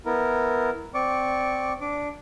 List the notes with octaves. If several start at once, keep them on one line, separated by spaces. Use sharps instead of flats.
B3 E4 A#4
C4 D5 C#6 D6
D4 D6